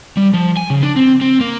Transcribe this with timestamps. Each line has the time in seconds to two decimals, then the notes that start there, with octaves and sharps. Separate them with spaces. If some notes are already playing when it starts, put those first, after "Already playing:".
0.17 G3
0.34 F3
0.57 G#5
0.70 C#3
0.83 D4
0.96 C4
1.21 C4
1.40 A#3